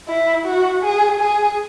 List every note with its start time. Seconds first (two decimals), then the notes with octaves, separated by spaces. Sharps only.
0.08 E4
0.45 F#4
0.83 G#4
1.20 G#4